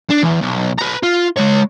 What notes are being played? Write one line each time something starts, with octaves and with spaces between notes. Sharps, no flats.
D4
E2
B1
B4 A#5
F4
G#3 C#5